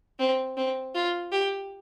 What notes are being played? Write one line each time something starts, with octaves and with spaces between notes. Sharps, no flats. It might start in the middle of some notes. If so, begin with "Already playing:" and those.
C4
C4
F4
G4